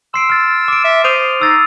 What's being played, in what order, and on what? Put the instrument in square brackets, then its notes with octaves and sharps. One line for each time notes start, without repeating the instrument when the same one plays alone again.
[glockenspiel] C6 C7 D7 [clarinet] E6
[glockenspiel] F6 A6
D6 D7
[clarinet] E5
[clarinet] C5 [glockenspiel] D#6 D#7 F7
[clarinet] D#4 [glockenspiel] E6 A6 C7